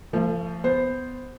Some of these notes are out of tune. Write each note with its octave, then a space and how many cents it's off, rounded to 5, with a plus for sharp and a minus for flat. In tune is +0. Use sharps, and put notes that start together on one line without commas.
F3 -20 A3 +35
B3 +15 C5 +0